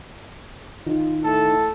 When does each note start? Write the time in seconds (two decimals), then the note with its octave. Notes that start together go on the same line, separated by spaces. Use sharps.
0.86 D#3 F4
1.24 A2 A4